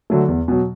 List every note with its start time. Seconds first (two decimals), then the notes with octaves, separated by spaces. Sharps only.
0.10 D3 F#3 A3
0.28 E2
0.48 B2 F#3